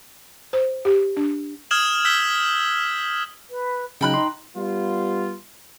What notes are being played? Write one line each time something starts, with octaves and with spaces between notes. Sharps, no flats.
C5
G4
D4
D#6 F6 G#6 E7 F#7
E6 G6 B6 F#7 G7
B4
C#3 F#3 D#4 D#5 G5 B5 F#6
D#4 C6
G3 B3 F4